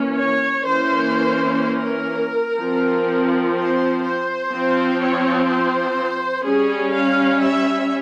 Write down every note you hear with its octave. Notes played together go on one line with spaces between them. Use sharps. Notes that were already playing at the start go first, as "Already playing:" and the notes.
Already playing: E3 A#3 C#4
C#5
E3 A#3 C#4 C5
A#4
F3 C4
C5
C5
F3 C4
C#5
C5
G3 C#4 G#4
F5
E5